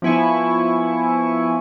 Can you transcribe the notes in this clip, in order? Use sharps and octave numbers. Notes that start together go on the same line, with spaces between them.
F3 B3 E4 G#5 C#6